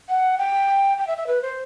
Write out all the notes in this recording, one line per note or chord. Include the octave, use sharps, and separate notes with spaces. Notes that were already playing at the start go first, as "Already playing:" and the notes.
F#5
G5
G5
E5
E5
B4
C5